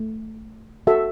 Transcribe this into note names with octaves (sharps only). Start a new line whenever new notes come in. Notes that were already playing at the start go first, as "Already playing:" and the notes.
Already playing: A3
F#4 A4 E5